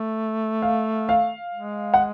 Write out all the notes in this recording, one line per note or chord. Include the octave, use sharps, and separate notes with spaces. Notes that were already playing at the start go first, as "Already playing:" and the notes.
Already playing: A3
F5
F5
G#3
F#5